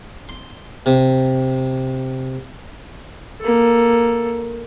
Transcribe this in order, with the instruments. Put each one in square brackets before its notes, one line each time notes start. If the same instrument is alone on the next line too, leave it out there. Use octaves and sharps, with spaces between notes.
[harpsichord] C6
C3
[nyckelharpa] A#3 A4